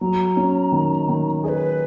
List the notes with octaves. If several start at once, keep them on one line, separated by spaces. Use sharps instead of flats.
F#3 A#5
C#4
D#3
D#3
G#4 B4 D#5